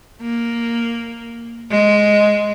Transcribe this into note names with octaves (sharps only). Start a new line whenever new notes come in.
A#3
G#3